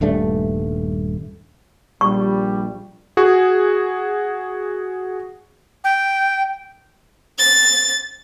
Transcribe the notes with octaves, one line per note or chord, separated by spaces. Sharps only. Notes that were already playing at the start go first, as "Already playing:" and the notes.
D#1 G2 A3 D4
A#1 G3 C#6
F#4 G#4
G5
A6